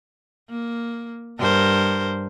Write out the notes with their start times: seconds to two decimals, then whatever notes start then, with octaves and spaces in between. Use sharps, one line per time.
0.50 A#3
1.39 G2 A#4 C5